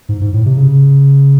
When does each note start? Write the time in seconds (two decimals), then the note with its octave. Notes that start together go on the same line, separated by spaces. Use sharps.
0.09 G#2
0.21 G#2
0.33 A2
0.46 C3
0.57 C#3